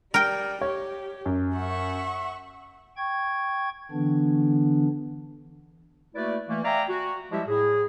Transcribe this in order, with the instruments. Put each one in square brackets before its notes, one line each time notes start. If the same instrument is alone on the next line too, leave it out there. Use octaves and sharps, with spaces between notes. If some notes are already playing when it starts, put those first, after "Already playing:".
[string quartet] G3 [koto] A#4 G5
[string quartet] G4 [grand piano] C#5
[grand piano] F#2
[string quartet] E5 F#5 C#6
[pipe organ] G5 C#6 G#6
D3 E3 B3 D4
[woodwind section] A3 A#3 E4 F#4 B4 D5
E3 A3 A#3
D5 E5 F5 G5 G#5 A#5
F#4
F3 G3 G#3 E4 G4 E5
A2 G#4